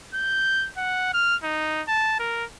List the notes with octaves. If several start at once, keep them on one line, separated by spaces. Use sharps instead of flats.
G6
F#5
F6
D#4
A5
A#4